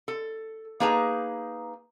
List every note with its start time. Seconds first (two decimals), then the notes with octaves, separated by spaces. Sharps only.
0.08 A4
0.80 A#3 D#4 G#4 B4 A5 A#5